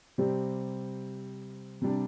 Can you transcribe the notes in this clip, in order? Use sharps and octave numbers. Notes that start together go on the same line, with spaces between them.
C3 G3 C4 G4
C3 G3 D4